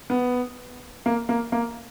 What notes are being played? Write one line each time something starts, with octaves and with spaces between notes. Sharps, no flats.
B3
A#3
A#3
A#3